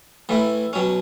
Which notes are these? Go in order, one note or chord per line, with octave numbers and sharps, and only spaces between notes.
A2 E3 A3 E4
B2 F#3 C#4